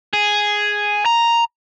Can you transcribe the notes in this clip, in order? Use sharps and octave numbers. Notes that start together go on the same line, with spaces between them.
G#4
A#5